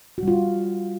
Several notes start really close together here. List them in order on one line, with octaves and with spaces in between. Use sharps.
F#4 G3 F4